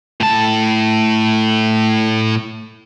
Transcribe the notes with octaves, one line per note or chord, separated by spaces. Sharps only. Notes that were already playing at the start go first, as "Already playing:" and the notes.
A2 A5